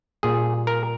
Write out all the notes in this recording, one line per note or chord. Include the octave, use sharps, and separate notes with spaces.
A#2 G3 G#4
A#4